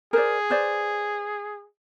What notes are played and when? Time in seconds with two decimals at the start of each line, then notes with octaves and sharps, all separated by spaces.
0.13 G#4 A#4 C5 D5
0.50 B4 C5 D5